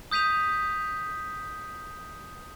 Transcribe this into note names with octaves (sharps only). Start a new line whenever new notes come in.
D#6 G6 B6 D#7 F7